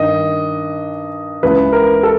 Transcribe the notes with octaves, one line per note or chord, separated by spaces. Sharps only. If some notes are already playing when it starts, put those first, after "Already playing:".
Already playing: G2 D#3 D#5
C#2 C#3 E3 B4
A#4
A4